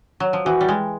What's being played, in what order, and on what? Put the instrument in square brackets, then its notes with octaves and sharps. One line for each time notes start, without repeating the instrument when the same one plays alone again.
[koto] F#3
F3
[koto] E3 [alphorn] F#4
[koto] G3
G#3